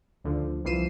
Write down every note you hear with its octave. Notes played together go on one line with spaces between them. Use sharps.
D2 D3 F3
C2 E3 F3 C7 D#7 E7